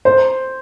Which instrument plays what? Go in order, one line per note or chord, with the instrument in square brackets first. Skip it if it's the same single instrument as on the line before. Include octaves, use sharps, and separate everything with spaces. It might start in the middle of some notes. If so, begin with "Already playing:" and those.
[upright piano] C5